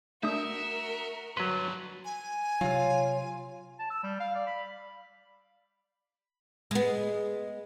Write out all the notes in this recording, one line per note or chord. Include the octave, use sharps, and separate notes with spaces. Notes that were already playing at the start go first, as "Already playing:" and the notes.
A3 D4 F#4 A#4 E5 D#6
G2 D3 F#3 B4 C6
G#5
C3 F#3 F4 C#5
A5
E6
G3
F5
D5
B5
G#3 B3